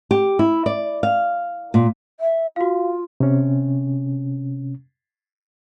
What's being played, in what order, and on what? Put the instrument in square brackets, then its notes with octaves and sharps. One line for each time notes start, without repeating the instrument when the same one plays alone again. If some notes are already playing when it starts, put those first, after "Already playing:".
[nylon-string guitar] G4
E4
D5
F5
A#2
[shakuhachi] E5
[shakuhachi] F4 [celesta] F#4 F5
[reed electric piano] C3 C#4